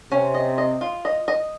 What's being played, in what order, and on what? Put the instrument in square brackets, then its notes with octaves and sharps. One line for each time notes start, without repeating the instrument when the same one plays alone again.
[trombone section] C3 C4 [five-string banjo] C#4
[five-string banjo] D#5
D#5
F4
D#5
D#5